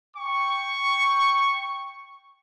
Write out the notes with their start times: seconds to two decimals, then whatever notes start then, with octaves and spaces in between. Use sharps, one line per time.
0.16 G5 C#6